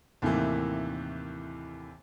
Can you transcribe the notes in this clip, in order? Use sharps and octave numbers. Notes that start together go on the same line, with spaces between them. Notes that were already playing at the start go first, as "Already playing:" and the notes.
D#2 A2 C3 D#3 E3